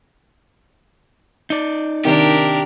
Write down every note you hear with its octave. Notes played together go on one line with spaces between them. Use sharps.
D#4 D5
C3 D#3 D4 G4 A#4